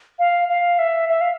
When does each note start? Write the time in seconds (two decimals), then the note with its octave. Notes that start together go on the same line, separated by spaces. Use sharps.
0.19 F5
0.48 F5
0.79 E5
1.09 E5
1.21 F5